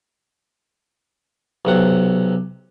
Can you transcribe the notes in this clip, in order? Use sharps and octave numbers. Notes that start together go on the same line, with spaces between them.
B1 C3 F#5